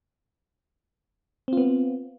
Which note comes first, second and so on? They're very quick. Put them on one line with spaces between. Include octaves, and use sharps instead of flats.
C4 F4 B3